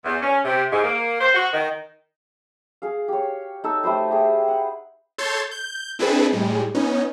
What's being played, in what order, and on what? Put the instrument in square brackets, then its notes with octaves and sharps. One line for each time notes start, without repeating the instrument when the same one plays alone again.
[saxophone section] E2
C#4
C3
G#2
A#3
C5
F#4
D#3
[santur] G#4 F5
G4 C#5
D#4 A4 E5 E6
A3 G4 B4 C5
G4 G#4
F#5
[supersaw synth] A4 C#5 C6 G6 A6
G6
C4 D4 E4 G#4 A4 B4
A2 G3 G#3
B3 C#4 D#4